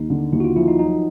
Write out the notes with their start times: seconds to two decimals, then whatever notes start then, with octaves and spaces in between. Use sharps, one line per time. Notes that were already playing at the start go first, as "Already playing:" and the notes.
Already playing: D#2 D#4
0.10 D3
0.33 D#2 E4
0.40 F#4
0.44 F4
0.56 F3 E4
0.68 D#4
0.79 F#3 D#4